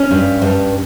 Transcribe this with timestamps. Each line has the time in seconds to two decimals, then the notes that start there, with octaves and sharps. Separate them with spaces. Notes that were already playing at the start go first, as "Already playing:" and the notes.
Already playing: C#4
0.11 G2
0.42 G2